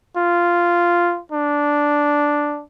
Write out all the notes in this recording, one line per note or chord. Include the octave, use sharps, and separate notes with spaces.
F4
D4